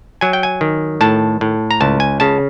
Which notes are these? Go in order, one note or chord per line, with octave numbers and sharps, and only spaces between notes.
F#3 G#5
G5
G#5
D#3
A2 A5
A2
A#5
C#2 A5
G#5
C#3 A5